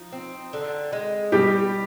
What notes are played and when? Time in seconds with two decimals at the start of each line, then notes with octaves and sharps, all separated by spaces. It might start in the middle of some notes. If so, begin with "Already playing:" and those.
Already playing: F3 D#4
0.12 C4
0.53 D3
0.93 G#3
1.32 B2 G3 G4